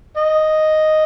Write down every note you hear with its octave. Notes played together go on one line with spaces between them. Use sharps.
D#5